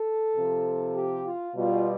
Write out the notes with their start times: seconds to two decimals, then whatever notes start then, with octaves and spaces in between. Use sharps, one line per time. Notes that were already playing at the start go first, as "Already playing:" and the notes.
Already playing: A4
0.37 C3 F3
0.96 G4
1.26 F4
1.56 B2 G3 F4